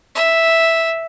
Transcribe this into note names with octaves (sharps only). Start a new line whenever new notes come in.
E5